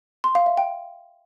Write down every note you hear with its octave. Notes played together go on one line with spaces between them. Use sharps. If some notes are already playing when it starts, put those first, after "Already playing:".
C6
F5
E5
G5